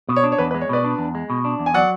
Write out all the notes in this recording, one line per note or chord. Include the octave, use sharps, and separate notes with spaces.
B2
C#5
D4
C#5
E2 B4
B4
G#3
C#5
B2 B4 D5
D4
E2
G#3
B2
D4
E2
G#5
F#3 D5 F#5